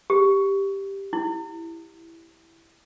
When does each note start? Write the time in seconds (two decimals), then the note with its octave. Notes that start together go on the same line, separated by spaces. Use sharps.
0.10 G4
1.13 E4